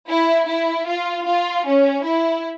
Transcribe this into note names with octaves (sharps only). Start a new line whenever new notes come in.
E4
E4
F4
F4
C#4
E4